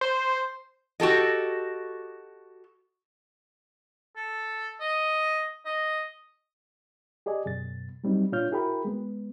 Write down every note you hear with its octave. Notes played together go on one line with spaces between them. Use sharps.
C5
F#4 G4 A4 D#5
A4
D#5
D#5
G4 G#4 D5 D#5 G#5
F#2 B2 A6
F#3 G3 C4 D#4
A#2 D4 F4 C#5 F6 G6
E4 F#4 G#4 A#4 G5 B5
G#3 B3